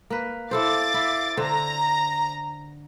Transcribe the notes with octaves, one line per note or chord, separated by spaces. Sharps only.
A#3 B4
E4 A4 C5 F5 D6 A6
E4
D3 C5 A#5